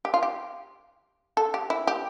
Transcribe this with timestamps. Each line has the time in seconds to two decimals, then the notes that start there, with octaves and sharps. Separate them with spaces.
0.05 G4
0.14 F4
0.23 G4
1.37 A4
1.54 G4
1.70 E4
1.87 G4